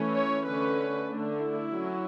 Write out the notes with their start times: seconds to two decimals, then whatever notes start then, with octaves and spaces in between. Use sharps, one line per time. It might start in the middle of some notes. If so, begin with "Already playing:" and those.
Already playing: E3 A3 C#4
0.13 C#5
0.44 D3 A3 C#4 B4
1.07 D3 A3 D4
1.38 E4
1.69 F#3 C#4